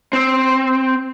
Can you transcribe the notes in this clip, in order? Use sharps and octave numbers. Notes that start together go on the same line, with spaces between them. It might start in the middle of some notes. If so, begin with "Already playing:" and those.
C4